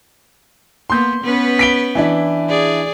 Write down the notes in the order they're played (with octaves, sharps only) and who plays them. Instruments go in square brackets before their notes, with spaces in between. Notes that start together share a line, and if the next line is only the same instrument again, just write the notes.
[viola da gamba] A#3 B3 [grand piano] C6 G6
[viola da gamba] B3 C#4 B4
[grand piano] B6 D7 G7
E3 D4 E4
[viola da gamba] G#4 D5